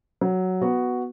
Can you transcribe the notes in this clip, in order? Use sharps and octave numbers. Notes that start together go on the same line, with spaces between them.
F#3
B3 F#4